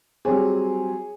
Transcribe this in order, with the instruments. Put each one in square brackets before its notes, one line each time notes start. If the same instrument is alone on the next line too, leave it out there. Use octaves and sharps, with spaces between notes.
[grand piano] F#3 G3 C4 [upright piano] G#4 C#5